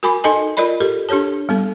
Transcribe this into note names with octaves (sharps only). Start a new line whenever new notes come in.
F#4 A#4 G#5 B5 D6
D#4 A4 D#5 G#5 A5
F4 A#4 D5 D#5 B5
G4 A4 A#4
D4 G4 A4 C#5 A5
G3 B3 A4